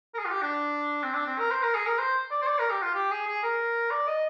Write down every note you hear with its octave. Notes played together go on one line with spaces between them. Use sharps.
A#4
G#4
F4
G4
D4
C4
D4
C4
A#4
C5
A#4
G#4
A#4
C5
D5
C5
D5
A#4
G4
F4
G4
G#4
G#4
A#4
D5
D#5